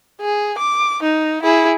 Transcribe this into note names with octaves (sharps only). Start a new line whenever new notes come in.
G#4
D6
D#4
E4 G#4